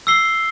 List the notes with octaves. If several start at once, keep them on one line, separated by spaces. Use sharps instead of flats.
E6 C7 G7